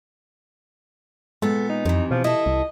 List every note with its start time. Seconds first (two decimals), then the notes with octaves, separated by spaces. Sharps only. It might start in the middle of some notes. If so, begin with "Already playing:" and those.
1.42 A#2 G#3 B3 A4
1.69 D#4
1.85 F2 C3 E3
2.11 B2 F3
2.24 E4 A4 D#5
2.46 C2